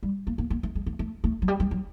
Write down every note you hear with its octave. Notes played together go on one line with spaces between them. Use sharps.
G3
A#3
A#3
A#3
A3
G#3
A3
A3
A3
F#3
G3
G3
F#3